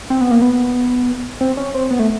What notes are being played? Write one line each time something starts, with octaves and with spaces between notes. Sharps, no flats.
C4
B3
A#3
B3
C4
C#4
C4
B3
A3